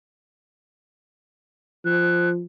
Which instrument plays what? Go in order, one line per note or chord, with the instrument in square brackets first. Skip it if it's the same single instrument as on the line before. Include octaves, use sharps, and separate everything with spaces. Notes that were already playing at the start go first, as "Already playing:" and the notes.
[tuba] F3 [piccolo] F#6